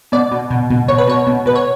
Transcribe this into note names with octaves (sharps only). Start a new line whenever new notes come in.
B2 D5
B2
B2
B2
B2 C#5
B4
B2 C#5
B2
B2 B4
C#5